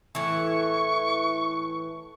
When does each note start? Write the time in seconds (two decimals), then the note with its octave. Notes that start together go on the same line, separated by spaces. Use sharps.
0.15 A2 E3 C#6